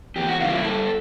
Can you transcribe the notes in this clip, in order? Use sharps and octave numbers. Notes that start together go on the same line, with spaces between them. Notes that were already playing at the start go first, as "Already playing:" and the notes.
E2 G4
F#4
C#3 E3 G3 A#3 F4
E4
G2 A4